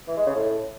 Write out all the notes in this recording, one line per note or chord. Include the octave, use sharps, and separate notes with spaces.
E3
G#3
C#3
A2